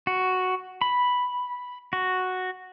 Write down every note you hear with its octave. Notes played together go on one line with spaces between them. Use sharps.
F#4
B5
F#4